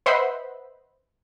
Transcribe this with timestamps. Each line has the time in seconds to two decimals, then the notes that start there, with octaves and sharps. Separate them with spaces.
0.06 B4 C5 D#5 E5 F#5 B5